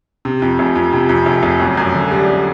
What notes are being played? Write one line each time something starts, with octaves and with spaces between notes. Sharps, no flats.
C3
F2
F1
F2
C3
F2
F1
F1
F#2
F#2
D3
G3
G3